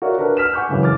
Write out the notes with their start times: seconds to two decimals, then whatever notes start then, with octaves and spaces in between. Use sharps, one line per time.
0.02 F#4 A#4 C#5 D5 E5 F5
0.18 D4 F#4 A#4 B4
0.37 E6 F6 B6 E7
0.53 F#5 G#5 C#6 D6 G6
0.69 F#2 C#3 E3 G#3
0.83 D6 F6 A6